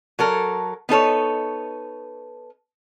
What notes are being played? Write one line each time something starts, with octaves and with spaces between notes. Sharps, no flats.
F#3 A4 A#4
B3 D#4 A4 C#5